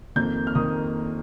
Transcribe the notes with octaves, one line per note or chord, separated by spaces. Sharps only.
F2 D#3 A#3 G6
F6
D#3 A#3 D#6